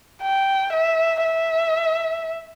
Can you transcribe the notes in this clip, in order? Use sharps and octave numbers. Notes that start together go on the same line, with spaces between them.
G5
E5
E5